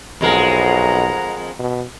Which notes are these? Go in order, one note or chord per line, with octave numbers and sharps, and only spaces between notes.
B1 F2 G#3 A#4 F#5 A#5
B2